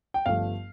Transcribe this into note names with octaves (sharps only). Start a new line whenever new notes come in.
G5
G1 G2 F3 A3 F5